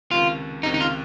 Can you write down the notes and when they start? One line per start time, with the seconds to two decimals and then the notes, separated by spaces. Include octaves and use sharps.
0.11 C#2 C3 D#3 F4
0.63 C#2 C3 D#3 D#4
0.74 D#4
0.81 F4